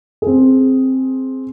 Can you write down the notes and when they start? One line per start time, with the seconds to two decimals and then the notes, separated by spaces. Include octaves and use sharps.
0.22 C4 G#4